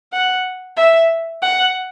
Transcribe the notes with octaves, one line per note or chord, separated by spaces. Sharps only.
F#5
E5
F#5